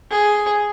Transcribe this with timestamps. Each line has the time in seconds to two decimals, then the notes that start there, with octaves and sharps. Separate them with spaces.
0.11 G#4